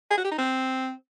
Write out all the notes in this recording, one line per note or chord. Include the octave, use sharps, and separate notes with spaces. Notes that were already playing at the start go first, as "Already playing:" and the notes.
G#4
F#4
G4
D#4
C4